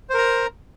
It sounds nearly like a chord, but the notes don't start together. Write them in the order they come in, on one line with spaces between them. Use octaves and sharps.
C5 A#4 A#5